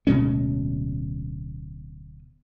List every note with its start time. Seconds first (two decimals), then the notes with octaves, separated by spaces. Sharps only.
0.07 D1 B2 G#3 C#4